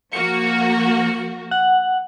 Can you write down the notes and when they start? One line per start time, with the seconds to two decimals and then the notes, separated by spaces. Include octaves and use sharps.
0.13 F3 A#3 F#4 C#7
1.51 F#5